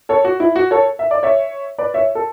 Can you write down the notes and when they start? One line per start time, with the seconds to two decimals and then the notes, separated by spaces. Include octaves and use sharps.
0.09 A4 C#5
0.24 F#4
0.40 E4
0.56 F#4
0.71 A4 C#5
0.99 E5
1.11 D5
1.23 C#5 E5
1.78 B4 D5
1.94 C#5 E5
2.15 A4